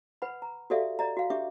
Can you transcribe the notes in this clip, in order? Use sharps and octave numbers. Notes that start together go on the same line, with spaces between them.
B4 F#5 B5
A#5
F#4 G4 A4 D5 E5 F5
D5 D#5 A#5
F#4 F5
D4 G4 E5 D6